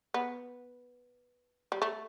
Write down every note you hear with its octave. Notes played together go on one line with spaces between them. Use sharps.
B3
G3
A3